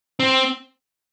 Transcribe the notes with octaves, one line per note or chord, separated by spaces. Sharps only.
C4